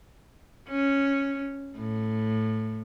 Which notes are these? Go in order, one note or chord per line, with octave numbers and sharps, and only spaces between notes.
C#4
A2